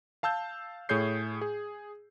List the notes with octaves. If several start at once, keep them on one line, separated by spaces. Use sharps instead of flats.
F5 A5 E6 G6
A2 G#4 C#5 G6 C7
G#4